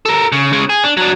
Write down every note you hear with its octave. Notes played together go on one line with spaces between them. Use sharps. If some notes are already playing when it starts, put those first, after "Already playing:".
A4 A#4
C#3
C#3 G#3
G#4
D4
F#3 D4